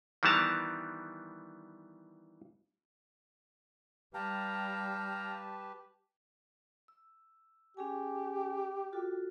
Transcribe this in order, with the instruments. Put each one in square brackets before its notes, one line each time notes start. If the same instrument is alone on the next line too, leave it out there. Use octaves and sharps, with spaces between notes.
[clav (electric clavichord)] D#3 E3 G3 B3 A5 A#5
[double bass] G3 [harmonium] G4 B4 [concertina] F5 G5 A#5 [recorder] A5
[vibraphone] E6
[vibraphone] C#4 G#4 G#5 [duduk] G4
[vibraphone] F4 F#4 A4